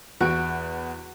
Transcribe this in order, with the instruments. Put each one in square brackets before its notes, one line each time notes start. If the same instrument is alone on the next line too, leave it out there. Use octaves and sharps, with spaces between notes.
[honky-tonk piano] E2 D7 [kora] F#4